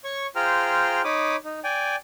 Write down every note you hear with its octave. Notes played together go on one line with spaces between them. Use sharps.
C#5 C#6
F4 G#4 C5 G5 A#5 F6
D#4 C#5 B5 D6 D#6
D#4
D5 G5 G#5